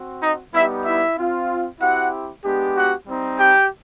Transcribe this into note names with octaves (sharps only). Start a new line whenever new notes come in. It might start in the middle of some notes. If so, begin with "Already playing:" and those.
Already playing: C4 F#4
D#4 D#5
G3 B3 D#4 E4 G4 E5
E4 E5
C4 F4
C4 E4 F#4 G4 F#5
G#3 B3 D4 G4
F#4 F#5
G3 C4 D#4
G4 G5